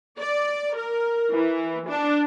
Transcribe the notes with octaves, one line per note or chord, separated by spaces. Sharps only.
D5
A#4
E3
D4